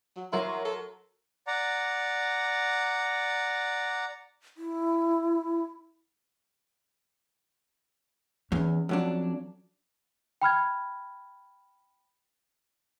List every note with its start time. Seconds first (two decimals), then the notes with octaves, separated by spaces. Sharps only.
0.17 F#3
0.33 F#3 E4 A#4 C6
0.65 A4
1.47 D5 F#5 A#5
4.57 E4
8.52 E2 C#4
8.89 F2 F#3 D4
10.42 G5 B5 F6 G#6